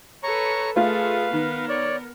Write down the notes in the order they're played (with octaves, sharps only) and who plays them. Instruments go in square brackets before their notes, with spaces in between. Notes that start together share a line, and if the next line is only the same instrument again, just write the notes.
[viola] A4 B4 [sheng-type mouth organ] C#5 A#5 C#6
[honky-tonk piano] A3 F4 [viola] G#4 A4 [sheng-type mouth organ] B4 F5
[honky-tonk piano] D#3 [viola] B3 A#4
[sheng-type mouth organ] C#5 D5